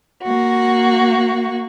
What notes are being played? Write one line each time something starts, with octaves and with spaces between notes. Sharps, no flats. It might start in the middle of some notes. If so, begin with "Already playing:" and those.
A#3 F#4